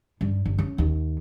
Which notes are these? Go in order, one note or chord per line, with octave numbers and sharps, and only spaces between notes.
G2
G1
C#3
D#2